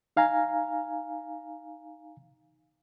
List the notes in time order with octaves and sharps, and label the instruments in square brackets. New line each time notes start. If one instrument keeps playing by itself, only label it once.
[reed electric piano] D#4 F5 G#5 A#5